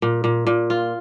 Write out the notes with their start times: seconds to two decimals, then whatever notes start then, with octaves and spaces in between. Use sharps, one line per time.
0.02 A#2
0.24 A#2
0.47 A#2
0.70 F4